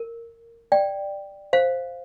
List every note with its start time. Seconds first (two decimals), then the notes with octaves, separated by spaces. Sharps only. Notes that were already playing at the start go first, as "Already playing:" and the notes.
Already playing: A#4
0.72 D5 G5
1.53 C5 F5